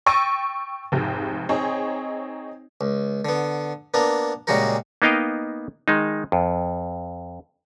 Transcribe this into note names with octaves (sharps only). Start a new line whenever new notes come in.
G5 C#6 E6 A6 A#6 D#7
F1 G#2 G4
C4 D#4 G#4 C#5
C#2
D3 B3
A#3 B3 D4 A#4
A#2 C#3 G3 G#3 F#4 A#4
A#3 B3 D#4 D#5 F5 G5
D#3 G#3 D#4
F2